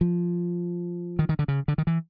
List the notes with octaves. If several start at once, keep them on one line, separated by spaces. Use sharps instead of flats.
F3
D#3
D#3
D3
C#3
D3
D#3
E3